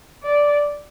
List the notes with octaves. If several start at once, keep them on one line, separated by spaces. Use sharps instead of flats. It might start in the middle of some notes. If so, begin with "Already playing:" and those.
D5